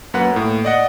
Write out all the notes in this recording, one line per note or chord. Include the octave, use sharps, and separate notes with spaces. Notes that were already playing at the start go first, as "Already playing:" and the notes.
F#2 A#3 B4 F#5
A2 A#3
D5 D#5 F#5